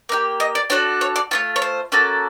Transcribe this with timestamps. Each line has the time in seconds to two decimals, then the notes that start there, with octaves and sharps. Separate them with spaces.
0.09 A#3 D#4 G4
0.40 D#5
0.55 D5
0.70 D4 F#4 A4 C#5
1.01 C#5
1.16 D5
1.31 A3 C#4 F4 C#5
1.56 C#5
1.62 C5
1.92 A#3 C#4 F#4 A4